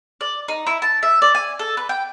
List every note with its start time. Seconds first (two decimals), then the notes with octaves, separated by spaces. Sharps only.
0.21 D5
0.48 D#4
0.67 E4
0.82 A5
1.03 E5
1.22 D5
1.35 G#5
1.59 A4
1.77 B4
1.89 G5